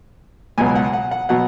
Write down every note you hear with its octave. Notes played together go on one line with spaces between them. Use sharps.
C#2 B2 F#3 G#5
F#5
F#5
F#5
B2 F#3 F#5